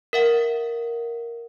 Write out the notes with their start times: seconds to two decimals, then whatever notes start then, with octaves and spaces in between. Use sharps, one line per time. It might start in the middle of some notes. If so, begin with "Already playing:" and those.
0.13 A#4 E5 F#5